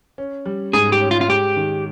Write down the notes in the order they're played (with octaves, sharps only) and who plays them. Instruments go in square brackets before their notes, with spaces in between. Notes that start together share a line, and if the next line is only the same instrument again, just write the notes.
[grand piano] C#4
G3
[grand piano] G#2 [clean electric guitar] G#4
[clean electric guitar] G4
[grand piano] C#4
[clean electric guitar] F4
F4
[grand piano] G#3 [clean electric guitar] G4
[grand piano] D#3